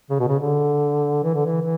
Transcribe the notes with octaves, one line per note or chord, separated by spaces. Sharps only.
C#3
B2
C#3
D3
E3
D3
E3
E3